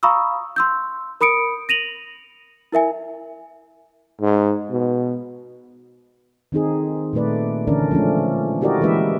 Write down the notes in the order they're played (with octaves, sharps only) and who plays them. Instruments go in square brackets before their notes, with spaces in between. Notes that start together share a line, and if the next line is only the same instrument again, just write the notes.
[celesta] F5 A#5 B5 C#6 D#6 E6
C6 E6 G6
A#4 B5 D#6 C#7 D7
A#6 D#7 F7 F#7
E4 A#4 E5 G#5
[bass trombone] G#2
B2
[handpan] D#3 C4 D#4 G#4
A#2 D#3 A3 B4 D5
D3 E3 C#4 D4 A#4 D5
F3 G#3 A3 C#4
E4 F#4 G4 A#4 D5 D#5
E3 G#3 A#3 C#4 B4 E5